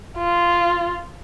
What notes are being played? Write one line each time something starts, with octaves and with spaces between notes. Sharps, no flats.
F4